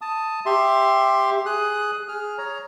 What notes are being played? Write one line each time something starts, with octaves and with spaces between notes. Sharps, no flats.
A5 D#6
G4 E5 C6
G#4 D#6 F#6
G#4 F6
C#5 A#5